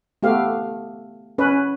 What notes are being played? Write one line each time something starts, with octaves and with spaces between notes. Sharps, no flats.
A3 B3 G4 F5
C#4 B4